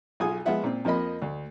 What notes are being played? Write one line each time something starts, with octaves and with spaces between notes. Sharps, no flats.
B1 F4 G#4 G#5 D#6
F3 G#3 B3 F4 E5 F#5
A#2 C4
F2 F3 A#3 D#5 B5
D2